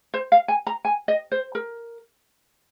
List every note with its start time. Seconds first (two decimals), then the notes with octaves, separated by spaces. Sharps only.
0.14 C5
0.32 F5
0.48 G#5
0.67 A#5
0.85 G#5
1.08 D#5
1.32 C5
1.55 A#4